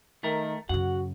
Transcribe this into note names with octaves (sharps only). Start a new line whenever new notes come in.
D#3 A3 A#4
F#2 C#3 F#4 F#5